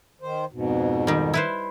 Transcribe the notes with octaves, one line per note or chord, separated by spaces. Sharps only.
D#3 C5
F2 G#2 B2
D#3 G3
E4 B4 C5